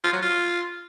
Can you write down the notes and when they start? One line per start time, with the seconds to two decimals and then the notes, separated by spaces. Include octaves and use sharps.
0.04 F4
0.13 F#3
0.22 F4